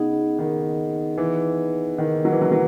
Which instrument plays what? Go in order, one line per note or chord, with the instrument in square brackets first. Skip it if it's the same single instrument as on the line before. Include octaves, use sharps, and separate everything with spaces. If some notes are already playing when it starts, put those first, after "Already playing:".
Already playing: [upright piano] C#3 [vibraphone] B3 D#4 G#4 D#5 F#5
[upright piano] D#3
E3
D#3
F#3
E3
F#3
F#3